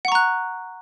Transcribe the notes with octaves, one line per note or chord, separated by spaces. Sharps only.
F#5 A#5 C#6 F#6